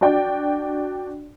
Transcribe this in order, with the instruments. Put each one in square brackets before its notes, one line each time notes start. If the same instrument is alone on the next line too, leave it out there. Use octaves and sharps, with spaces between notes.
[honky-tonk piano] D4 F#4 D5 G5